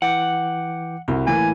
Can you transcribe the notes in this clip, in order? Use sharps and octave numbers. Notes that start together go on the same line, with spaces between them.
E3 F#5 G5 D6
C2 F#4
A2 E3 A#3 G#5